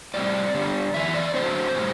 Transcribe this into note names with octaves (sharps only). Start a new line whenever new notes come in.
A2 G3 C4 D5
G2 D3 G3 B3
F#2 E3 B3 E5
D5
F#2 D3 F#3 A3 C4 C5
A2 G3